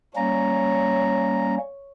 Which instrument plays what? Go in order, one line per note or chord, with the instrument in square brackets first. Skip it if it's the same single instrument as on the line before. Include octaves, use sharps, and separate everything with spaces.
[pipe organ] G3 A#3 C#4 [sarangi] C#5 [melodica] A#5